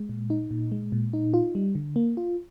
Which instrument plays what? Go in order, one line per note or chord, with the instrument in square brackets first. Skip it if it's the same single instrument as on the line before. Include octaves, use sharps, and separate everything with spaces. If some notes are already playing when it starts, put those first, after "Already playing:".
Already playing: [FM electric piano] G#3
A#2
D#4
A#2
G#3
A#2
D#4
F4
G3
D3
A#3
F4